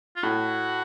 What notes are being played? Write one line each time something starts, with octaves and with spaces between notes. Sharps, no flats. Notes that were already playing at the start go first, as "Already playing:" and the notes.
F4
A2 F#4